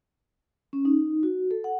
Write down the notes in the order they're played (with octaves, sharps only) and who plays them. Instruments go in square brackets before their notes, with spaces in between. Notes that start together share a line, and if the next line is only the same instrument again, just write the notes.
[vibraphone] C#4
D#4
F#4
A4
F#5